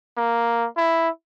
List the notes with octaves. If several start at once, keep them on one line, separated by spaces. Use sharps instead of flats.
A#3
E4